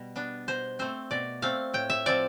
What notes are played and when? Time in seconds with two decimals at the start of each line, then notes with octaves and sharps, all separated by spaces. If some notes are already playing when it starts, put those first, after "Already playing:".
Already playing: B2 G3
0.16 B3 D4
0.48 B2 C5
0.79 A3 C4 C5
1.11 B2 D5
1.42 A3 C4 F5
1.74 A2 G5
1.90 E5
2.06 F3 C4 D5